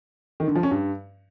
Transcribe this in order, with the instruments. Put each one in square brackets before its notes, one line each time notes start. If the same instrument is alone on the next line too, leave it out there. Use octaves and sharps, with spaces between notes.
[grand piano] D#3
D3
F3
C#4
G2